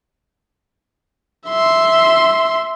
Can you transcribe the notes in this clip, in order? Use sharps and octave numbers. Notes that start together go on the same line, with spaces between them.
E5 C6